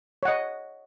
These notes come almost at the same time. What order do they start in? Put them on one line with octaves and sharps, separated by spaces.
C#5 F#5 D#5